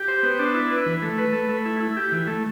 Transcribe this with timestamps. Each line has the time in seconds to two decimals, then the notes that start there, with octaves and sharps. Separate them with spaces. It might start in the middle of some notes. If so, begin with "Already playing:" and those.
Already playing: G4
0.08 C5
0.23 B3
0.39 D4
0.54 E4
0.71 B4
0.86 E3
1.02 A3
1.18 B4
1.33 A3
1.49 A3
1.65 E4
1.80 E4
1.97 G4
2.12 E3
2.27 A3